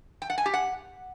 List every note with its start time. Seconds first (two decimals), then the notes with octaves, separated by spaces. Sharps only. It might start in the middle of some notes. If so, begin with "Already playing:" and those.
0.22 G5
0.30 F#5
0.38 G#5
0.46 G4
0.54 F#5